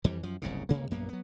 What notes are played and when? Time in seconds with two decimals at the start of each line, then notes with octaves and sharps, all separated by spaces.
0.04 F2 E3 G3
0.23 F#2 F3
0.42 F#1 C2 G#2 C#3
0.69 G1 C#2 C3 A#3
0.91 A#1 F#2 A#3 B3
1.09 F#3 B3